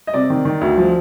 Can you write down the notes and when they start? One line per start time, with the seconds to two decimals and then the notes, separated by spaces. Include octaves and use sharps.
0.07 D#5
0.14 C3 D5
0.30 D#3
0.45 D#3
0.61 D2
0.78 F3